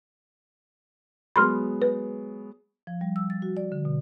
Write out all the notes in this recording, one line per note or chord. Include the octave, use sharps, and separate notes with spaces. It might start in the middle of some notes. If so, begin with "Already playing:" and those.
F#3 G#3 B3 B5 C6 F6
B4
F3
G3
E6
A6
F#4
D5
D3
B2